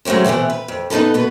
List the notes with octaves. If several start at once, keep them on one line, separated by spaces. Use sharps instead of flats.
F#3 G#3 A3 C4 C#4
B2 E3 A3 B3 C4
B4
F2
B3 D#4 F4 A4 B4
B2 B3 B4